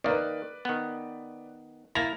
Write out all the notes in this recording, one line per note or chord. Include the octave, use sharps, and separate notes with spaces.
D#3 A#3 B4 D5
D#3 B3
A#3 E4 A6 A#6 F7